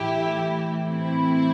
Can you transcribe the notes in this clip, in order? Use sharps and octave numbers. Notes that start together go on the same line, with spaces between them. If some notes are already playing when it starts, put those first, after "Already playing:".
Already playing: A2 E3 E4 G4
C4 E4